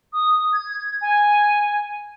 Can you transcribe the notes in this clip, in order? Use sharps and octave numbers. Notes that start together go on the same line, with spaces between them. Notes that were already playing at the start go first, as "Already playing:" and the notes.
D#6
G#6
G#5